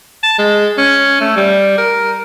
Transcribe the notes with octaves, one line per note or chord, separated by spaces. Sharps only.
A5
G#3
C#4
A3
G3
A#4